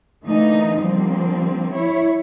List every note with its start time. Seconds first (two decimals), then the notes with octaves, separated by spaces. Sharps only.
0.23 D3 E3 A3 A#3 D#4
0.78 D3 F3 G3 A#3 C4
1.71 E4 C#5